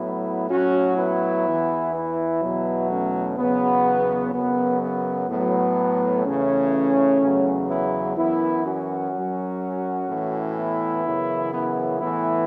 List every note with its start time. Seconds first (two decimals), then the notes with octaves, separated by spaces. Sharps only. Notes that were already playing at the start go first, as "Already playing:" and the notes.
Already playing: A2 F#3 B3 E4
0.50 A2 F#3 C#4 F#4
0.97 B3 E4
1.46 E2 E3
1.93 B3 E4
2.41 E2 B2 F#3
2.89 A3 C#4
3.37 E2 C#3 F#3 B3
4.33 F#2 C#3 F#3 B3
4.81 B3
5.29 A2 F#3 B3
6.25 E2 C#3 E3 A3 C#4
7.21 E2 C#3 F#3
7.69 B3 E4
8.17 F#2 E3 B3 E4
8.64 C#4 F#4
9.13 F#2 F#3
10.09 A2 E3
10.57 B3 E4
11.05 F#2 C#3 E3
11.53 B3 E4
12.00 A2 E3 B3 E4